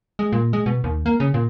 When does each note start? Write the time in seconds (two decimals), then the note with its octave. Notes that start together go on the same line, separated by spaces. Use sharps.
0.19 G#3
0.32 A#2
0.53 G#3
0.66 B2
0.84 D#2
1.06 A#3
1.20 C#3
1.34 A#2